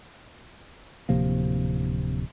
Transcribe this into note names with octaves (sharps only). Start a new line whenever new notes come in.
D1 C3 F3 A#3